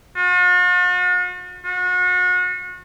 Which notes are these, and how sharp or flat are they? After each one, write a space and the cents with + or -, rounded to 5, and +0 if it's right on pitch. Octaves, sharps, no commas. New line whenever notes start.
F#4 -45
F#4 -35